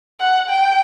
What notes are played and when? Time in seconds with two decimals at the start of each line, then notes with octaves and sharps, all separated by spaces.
0.20 F#5
0.50 G5